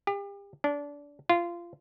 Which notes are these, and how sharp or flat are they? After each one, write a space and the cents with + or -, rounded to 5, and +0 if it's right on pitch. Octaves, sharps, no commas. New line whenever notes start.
G4 +35
D4 -25
F4 -20